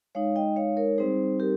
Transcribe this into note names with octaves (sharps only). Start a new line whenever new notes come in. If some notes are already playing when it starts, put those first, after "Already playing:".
G#3 D#4 C#5 F5
D#5 G5
C#5 F5
A#4 C#5
G3 C4 D#4 G#4 C5
G4 A#4